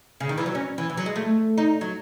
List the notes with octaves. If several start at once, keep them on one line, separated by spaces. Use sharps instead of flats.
C#3
D#3
E3
F#3
C#4
E3
E3
F#3
G#3
A3
D#4
F#3